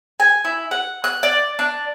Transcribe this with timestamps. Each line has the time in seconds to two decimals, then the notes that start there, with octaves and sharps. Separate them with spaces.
0.20 G#5
0.45 E4
0.71 F#5
1.04 F#6
1.23 D5
1.59 D4